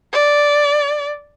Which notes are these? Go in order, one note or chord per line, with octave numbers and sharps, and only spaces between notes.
D5